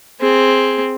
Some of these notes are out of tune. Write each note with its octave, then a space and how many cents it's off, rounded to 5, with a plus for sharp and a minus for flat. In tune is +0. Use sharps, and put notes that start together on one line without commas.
C4 +0 G#4 +0